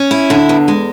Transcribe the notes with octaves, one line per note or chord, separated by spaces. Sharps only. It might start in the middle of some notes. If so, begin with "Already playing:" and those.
Already playing: C#4
E4
D3
E2
G#3